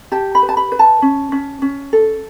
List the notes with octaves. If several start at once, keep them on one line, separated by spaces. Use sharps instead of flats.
G4 A5
B5
B4
A5
B5
B4
A5
C#4
C#4
C#4
A4